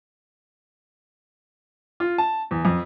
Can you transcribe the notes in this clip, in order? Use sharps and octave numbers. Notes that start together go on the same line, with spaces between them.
F4
A5
E2
F2